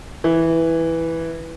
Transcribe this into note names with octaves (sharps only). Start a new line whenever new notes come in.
E3